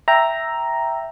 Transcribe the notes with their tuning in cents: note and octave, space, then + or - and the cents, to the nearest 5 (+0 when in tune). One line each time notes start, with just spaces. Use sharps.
E5 +0 G5 +0 A#5 +0